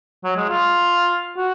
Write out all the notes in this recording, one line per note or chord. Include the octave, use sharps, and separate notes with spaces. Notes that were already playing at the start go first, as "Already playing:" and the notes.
F#3
G#3
F4
F#4